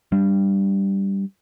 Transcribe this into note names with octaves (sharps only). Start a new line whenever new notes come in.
G3 D4